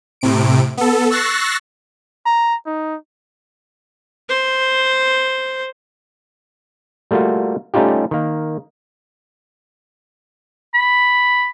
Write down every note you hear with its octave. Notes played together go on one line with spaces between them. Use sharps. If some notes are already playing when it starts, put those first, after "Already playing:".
A2 C3 D7
B3 A4
C#6 E6 F#6 A6 A#6 C7
A#5
D#4
C5
G3 A3 A#3 F4 F#4
G3 A3 C#4 D#4 F4 G4
D#3 A#3
B5